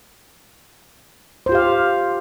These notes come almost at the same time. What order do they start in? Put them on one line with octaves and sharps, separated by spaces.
C5 F4 G4 F5